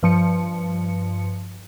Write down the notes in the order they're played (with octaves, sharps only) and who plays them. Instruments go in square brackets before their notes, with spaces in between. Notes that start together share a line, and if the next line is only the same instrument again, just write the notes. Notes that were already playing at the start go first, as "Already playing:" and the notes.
[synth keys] G2 F3 C#7